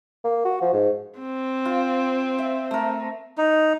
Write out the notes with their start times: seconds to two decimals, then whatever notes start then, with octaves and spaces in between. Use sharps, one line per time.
0.24 A#3
0.45 F#4
0.62 F3
0.73 G#2
1.19 C4
1.65 F4
2.39 E5
2.71 A3 A#4
3.38 D#4